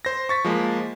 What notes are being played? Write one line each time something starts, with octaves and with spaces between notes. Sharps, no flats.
C5 A#6
C#6 A6 B6
F3 G#3 A#3